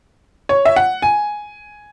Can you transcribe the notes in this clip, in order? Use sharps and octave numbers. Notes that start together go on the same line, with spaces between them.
C#5
E5
F#5
G#5